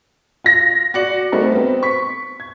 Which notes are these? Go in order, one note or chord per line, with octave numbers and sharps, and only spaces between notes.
F4 A#6
F#4 D5 C#7 F#7
G3 A3 C4 D#4 F#4 A#4
B3 C4
C#6 B6
G#6